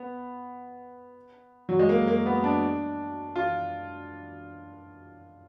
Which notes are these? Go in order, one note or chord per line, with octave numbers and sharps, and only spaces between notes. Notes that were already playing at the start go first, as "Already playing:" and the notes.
Already playing: B3
F#3
G#3
A#3
A#3
B3
D4
F4